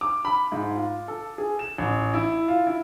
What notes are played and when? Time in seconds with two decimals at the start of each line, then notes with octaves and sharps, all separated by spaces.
0.01 D6
0.25 B5
0.52 G#2
0.75 F4
1.08 A4
1.38 G#4
1.59 E7
1.78 A1
2.14 E4
2.48 F4
2.67 E4